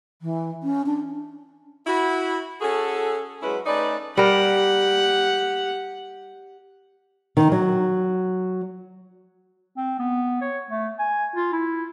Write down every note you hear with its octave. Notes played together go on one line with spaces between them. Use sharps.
E3
C#4
D4
E4 F#4
C#4 F#4 G#4 A4
F#3 G#3 C#4 E4 G#4 B4
A3 C#4 D#4 B4 D5
G3 G4 A#4 F#5
D#3
F#3
C4
B3
C#5
A3
G#5
F4
E4